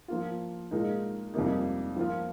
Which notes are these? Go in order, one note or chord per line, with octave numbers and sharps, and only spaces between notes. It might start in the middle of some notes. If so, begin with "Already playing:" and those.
F3 A#3 F4
A#2 G#3 D#4 A#4
F2 C3 G3 A#3 D#4
F3 A#3 F4